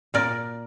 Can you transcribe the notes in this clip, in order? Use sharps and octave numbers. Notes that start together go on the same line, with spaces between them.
A#2 A#4 D5